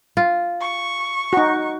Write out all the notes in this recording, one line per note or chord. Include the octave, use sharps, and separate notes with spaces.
F4
C#6
D#4 F#4